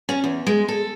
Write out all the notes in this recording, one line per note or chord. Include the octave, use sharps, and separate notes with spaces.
C#4
E2
G#3
A4